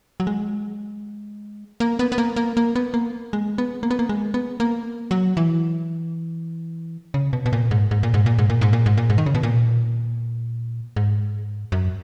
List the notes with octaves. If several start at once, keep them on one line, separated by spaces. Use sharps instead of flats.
F#3
G#3
A#3
B3
B3
A#3
A#3
A#3
B3
A#3
G#3
B3
A#3
B3
A#3
G#3
B3
A#3
F#3
E3
C#3
B2
B2
A#2
G#2
G#2
A#2
G#2
A#2
G#2
A#2
G#2
A#2
G#2
A#2
G#2
D#3
C#3
B2
A#2
G#2
F#2